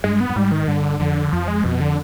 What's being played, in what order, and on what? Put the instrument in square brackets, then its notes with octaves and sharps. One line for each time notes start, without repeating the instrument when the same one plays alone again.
[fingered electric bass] G2 [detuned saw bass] G#3
[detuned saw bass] B3
[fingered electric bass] G2
[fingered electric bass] G#2 [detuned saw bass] G3
[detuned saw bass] D#3
[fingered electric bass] G2 [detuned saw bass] D3
[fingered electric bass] F2 [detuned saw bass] D3
[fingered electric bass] F2 [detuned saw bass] F3
[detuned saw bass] G#3
[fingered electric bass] F2 [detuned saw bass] B2
[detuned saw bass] D3